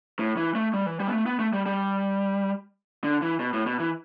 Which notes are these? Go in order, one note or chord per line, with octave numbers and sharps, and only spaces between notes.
A2
E3
A3
G3
E3
G3
B3
A3
B3
A3
G3
G3
D3
E3
B2
A2
B2
E3